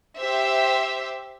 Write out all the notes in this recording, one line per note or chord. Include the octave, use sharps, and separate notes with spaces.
G4 C5 E5